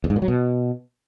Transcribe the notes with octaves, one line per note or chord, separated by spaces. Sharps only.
E2
G#2
A#2
F#3
B2